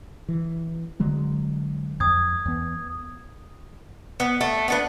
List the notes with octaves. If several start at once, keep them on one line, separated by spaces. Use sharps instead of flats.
E3
D3 F#3 G#3
F2 D#6 G#6
E2 B3
B3
A3
B3 D4 B4